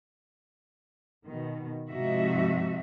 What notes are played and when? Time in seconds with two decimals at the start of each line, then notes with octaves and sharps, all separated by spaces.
1.26 B2 D#3
1.88 G#2 C3 F3 D#4 F#4 E5